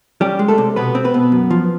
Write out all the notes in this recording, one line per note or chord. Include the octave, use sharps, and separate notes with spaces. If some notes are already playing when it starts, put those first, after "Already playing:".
G3 C#4 G4
G#3
A3 A4
C3
B2 B3 B4
C4
B3 B4
B2
F#2
F3